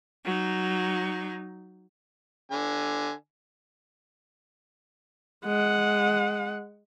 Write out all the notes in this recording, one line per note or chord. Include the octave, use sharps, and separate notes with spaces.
F#3 D#4
D3 G#5
G#3 F#5